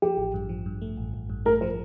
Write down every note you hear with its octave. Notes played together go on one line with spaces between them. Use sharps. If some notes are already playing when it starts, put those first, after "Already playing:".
F3 G4
A1
G2
F3
G2
A3
A1
A1
G2
A3 A#4
F3 C5